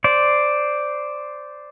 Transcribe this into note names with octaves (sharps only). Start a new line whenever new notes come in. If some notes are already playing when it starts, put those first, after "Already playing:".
C5 D5